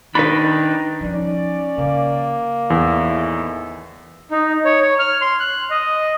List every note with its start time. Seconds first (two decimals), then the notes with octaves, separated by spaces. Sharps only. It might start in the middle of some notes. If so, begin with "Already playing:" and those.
0.15 D#3 D4 D#4 B4 B5
1.01 F3 C#4 D#4 D5
1.78 C#3 A#3
2.70 E2 A2 D#3 E3
4.31 D#4
4.65 C#5
4.81 C#5
4.99 F6
5.22 C6
5.40 F#6
5.70 D#5